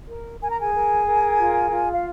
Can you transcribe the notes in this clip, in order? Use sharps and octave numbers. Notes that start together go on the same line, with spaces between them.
A#4
A#4 G#5
A#5
G#4 G#5
A#4
A#4
F4
F4
F5